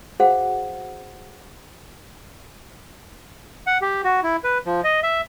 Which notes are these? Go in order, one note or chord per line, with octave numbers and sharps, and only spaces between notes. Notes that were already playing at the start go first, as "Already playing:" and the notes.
F#4 G#4 C5 F5 F#5
F#5
G4
F#4
E4
B4
F3
D#5
E5